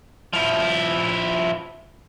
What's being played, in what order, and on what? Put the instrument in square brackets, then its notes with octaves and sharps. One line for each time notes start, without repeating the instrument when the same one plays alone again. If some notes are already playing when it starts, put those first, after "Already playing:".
[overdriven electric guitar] F3 E4